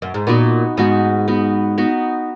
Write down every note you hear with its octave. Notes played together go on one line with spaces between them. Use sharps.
F#2
G#2
A#2 B3 D#4 F#4
G#2 B3 D#4 F#4
B3 D#4 F#4
B3 D#4 F#4